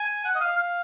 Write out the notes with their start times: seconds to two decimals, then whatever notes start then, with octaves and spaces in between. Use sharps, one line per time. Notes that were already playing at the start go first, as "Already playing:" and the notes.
Already playing: G#5
0.25 F#5
0.35 D#5
0.40 F5
0.57 F5